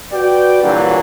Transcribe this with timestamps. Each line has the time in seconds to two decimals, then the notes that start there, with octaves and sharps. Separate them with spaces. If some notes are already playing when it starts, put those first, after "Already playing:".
0.13 F#4 B4 D5 G5
0.63 G2 A#2 D3 E3 F#3